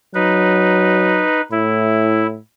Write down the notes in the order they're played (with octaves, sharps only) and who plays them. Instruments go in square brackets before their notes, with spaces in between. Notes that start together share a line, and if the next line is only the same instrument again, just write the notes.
[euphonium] F#3 [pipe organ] D#4 B4
[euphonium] A2 [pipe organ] E4